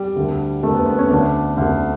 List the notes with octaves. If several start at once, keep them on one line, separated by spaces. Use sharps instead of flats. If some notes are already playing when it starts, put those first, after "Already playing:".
Already playing: G3
D2 D3
D2 D3 A3
B3
B3
C#4
D2 D3 D4
D2 D3